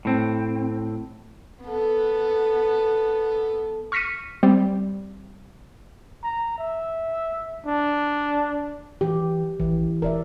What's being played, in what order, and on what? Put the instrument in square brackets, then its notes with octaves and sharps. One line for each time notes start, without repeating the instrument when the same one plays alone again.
[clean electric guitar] A2 C4
[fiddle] B3 A4
[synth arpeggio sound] C#6 F6 A#6 B6 C#7 D#7
G3 C4
[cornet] A#5
E5
D4
[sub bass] E3 [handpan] G4
[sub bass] A1 [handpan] E3
[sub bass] E1 [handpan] A#4 D5 E5